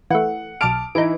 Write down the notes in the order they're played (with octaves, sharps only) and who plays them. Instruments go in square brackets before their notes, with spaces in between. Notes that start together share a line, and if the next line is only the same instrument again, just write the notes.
[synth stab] E3 A3 [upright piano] F#5
[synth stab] B1 D6 F6 [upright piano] A5 D7
[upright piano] E3 E4 [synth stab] D#4 D7